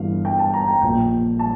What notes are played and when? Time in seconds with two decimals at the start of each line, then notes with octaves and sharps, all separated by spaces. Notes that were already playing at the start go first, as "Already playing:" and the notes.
Already playing: G1 G2 E3 F5
0.25 G5
0.39 A5
0.54 A#5
0.68 G5
0.82 A#1 A#2 F3 G5
1.39 A5